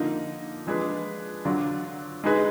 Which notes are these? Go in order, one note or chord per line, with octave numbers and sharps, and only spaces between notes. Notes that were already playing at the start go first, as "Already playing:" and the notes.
Already playing: D3 F3 A#3 D#4
F3 G#3 D4 G#4 B4
D3 F#3 D4 F4
G#3 D#4 G#4 B4